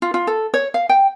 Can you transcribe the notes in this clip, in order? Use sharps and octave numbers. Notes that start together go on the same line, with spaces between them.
F4
F4
A4
C#5
F5
G5